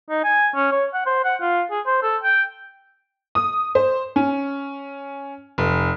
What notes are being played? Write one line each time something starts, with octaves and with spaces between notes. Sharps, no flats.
D#4
G#5
C#4
C#5
F#5
C5
F#5
F4
G#4
C5
A4
G5
D#6
C5
C#4
F1